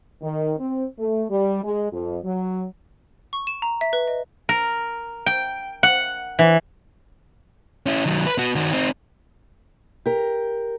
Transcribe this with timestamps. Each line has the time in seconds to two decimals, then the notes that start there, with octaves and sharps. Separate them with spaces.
0.21 D#3
0.58 C4
0.97 A3
1.29 G3
1.62 G#3
1.91 F2
2.23 F#3
3.33 C#6
3.47 E7
3.62 A#5
3.81 E5
3.93 B4
4.08 D#5
4.49 A#4
5.26 G5
5.83 F#5
6.39 E3
7.86 C#4 E4
8.06 D#3 F#3
8.26 B4
8.38 B3 F#4
8.55 D#3 F#4
8.72 C4 D#4
10.06 G4 A#4